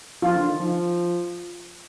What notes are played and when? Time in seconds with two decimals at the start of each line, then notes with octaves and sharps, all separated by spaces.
0.22 F3 F4
0.35 D3
0.48 D#3
0.60 F3